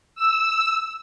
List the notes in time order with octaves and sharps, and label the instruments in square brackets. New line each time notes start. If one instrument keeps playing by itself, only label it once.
[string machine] E6